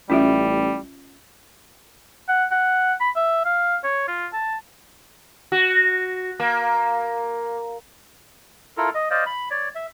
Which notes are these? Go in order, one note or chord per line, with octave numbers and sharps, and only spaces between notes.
A1 G3 C#4 F4 E5
F#5
F#5
B5
E5
F5
C#5
F4
A5
F#4
A#3
E4 F4 A4 A#4
D#5
C5 D5 D#5 F5
B5
C#5 D5
E5